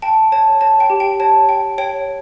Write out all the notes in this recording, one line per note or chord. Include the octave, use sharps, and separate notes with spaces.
G5 A5
C#5 A5
C#5 A5
G5
G4
G5
C#5 A5
G5
C#5 G5